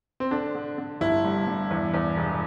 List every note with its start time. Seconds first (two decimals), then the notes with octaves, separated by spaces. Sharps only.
0.20 C4
0.31 D3 D4
0.55 D3
0.78 D3
1.01 G1 E4
1.24 G2
1.47 G2
1.70 E2
1.94 E2
2.16 E1